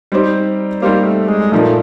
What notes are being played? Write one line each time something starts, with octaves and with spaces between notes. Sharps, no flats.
G3 C4 D#4 G4 C5
G3 A#3 C4 D#4 G4 C5
A3
G#3
A#2 F3 A3 A#3 D#4